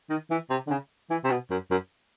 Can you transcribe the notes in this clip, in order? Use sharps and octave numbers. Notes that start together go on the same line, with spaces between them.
D#3
E3
C3
D3
C#3
E3
C3
B2
F#2
F#2